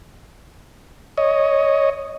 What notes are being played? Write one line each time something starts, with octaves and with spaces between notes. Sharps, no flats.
C#5 D#5